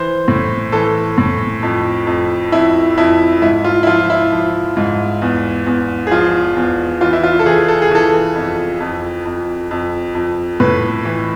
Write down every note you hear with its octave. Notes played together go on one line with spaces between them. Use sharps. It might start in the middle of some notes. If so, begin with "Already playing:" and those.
Already playing: E3 C5
A2
E3 A4
A2
F2
F2
F2 E4
F2 E4
G#2 E4
F4
E4
F3 F4
E4
F3
G#2
E2
E2
G#4
F3 F4
E2
E3 F4
E4
F4
A4
E3 G#4
A4
G#4
E3 A4
F2
F2
F2
F2
F2
A2 B4
E3